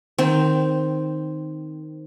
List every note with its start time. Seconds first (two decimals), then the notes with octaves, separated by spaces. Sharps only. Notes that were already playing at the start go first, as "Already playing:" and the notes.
0.18 D#3 C4